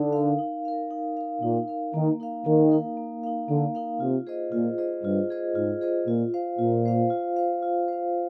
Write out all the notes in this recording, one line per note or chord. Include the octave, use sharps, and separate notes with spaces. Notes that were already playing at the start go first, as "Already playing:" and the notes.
Already playing: D3 D#4
A#4 F5
D#4
A#4 F5
D#4
A#4 F5
A#2 D#4
A#4 F5
D#3 A#3
D#4 A#4 F5
D#3 A#3
D#4 A#4 F5
A#3
D#4 A#4 F5
D3 A#3
D#4 A#4 F5
C3 F4
G#4 C5 D#5
A#2 F4
G#4 C5 D#5
G2 F4
G#4 C5 D#5
G#2 F4
G#4 C5 D#5
A#2 F4
C5 F5
A#2 F4
C5 F5
F4
C5 F5
F4
C5 F5